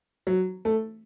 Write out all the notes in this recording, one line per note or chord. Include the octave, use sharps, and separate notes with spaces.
F#3
A3